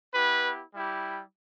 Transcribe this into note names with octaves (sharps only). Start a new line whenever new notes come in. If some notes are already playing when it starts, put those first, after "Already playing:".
B3 E4 G4 B4
G3 E4 G4